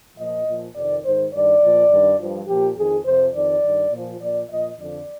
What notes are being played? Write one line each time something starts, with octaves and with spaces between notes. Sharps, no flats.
A#2 F3 D#5
A#2 F3
F2 C3 D#3 D5
G#2 D#3 C5
G2 D#3 D5
A#2 F3
G2 D#3
G2 F3
A#2 F3 G4
F2 D#3 G#4
F2 C3 F3 C5
F2 D#3 D5
G2 D#3
A#2 F3
A#2 F3 D5
A#2 F3 D#5
F2 D3 F3 D5